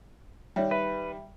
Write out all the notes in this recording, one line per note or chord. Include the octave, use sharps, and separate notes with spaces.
D#3 G3 C#5 E5 G5
B4 E5